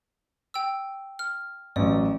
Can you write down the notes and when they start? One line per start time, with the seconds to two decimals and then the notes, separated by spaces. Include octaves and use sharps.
0.54 G5 E6
1.19 F6
1.76 A1 F#3 D5